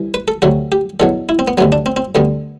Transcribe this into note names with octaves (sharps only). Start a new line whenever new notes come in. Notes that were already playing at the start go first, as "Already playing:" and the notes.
Already playing: C2 E3
B4
A4
D2 C3 F#3 F#4
G4
E2 B2 F#3 A4
E4
C4
B3
D2 C3 F#3 B3
D4
C4
C4
D2 D3 G3 B3